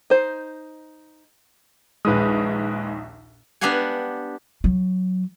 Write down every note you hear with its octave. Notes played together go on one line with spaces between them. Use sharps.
D#4 C5
A#1 D#2 G#3 B4 D#6
B3 D4 G4 F5 F#5 G#5
F#3